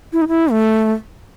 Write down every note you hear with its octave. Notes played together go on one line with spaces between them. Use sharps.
E4
D#4
E4
A3